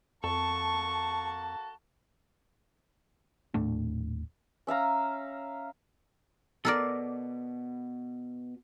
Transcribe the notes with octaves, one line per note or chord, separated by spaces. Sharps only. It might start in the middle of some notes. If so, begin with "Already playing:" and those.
F2 A#3 F#4 A4 A5 C#6
D#1 A2 A3 D4
C#4 E5 F5 A#5
B2 A4 A#4 D5